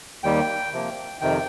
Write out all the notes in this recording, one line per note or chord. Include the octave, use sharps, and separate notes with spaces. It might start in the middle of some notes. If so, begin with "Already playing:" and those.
D#2 D#3 G3 G5
C3 F3 A#3
F2 C3 D#3 G5